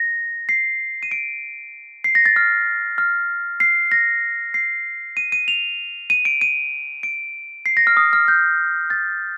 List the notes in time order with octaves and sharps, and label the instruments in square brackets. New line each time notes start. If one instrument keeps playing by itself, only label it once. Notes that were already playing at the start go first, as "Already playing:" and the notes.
Already playing: [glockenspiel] A#6
C7
D#7
D7
C7
A#6
A6
F6
F6
C7
A#6
C7
D#7
D#7
F7
D#7
D7
D#7
D7
C7
A#6
F6
D#6
F6
G6
A6